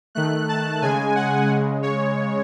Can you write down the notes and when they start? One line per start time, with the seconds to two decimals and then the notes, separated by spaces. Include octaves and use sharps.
0.15 D#3 A3 F#6
0.49 A5
0.82 C#3 G#3 G#5
1.15 F#5
1.49 C#3 G#3
1.83 C#5